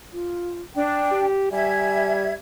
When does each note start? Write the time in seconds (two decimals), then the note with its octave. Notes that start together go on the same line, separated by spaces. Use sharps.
0.13 F4
0.75 D4 G5
1.12 G4
1.52 G3 E5 G#5 G#6